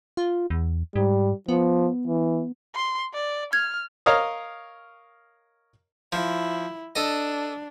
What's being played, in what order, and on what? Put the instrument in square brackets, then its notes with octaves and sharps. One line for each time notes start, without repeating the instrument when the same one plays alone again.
[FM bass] F4
E2
[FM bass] G#2 [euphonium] G3
[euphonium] F3 [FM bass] B3
[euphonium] E3
[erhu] C6
D5
[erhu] F6 [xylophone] G#6
[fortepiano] A#4 C#5 D#5 F5 D#6
[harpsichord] F3 [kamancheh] E4
[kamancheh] D4 [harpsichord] A4 D#5